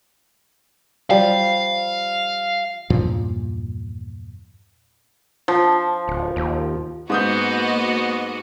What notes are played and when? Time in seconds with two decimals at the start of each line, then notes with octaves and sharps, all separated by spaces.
1.10 F3 G3 F5
2.90 E2 G2 A#2 F3
5.48 F3
6.08 D1
6.36 D#2
7.10 G#2 A#3 B3 F#4 D#5 D#6 G6